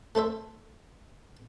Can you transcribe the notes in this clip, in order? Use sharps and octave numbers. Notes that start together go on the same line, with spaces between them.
A3 A4 C5 E5